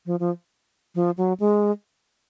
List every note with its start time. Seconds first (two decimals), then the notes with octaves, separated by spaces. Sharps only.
0.06 F3
0.20 F3
0.95 F3
1.17 F#3
1.40 G#3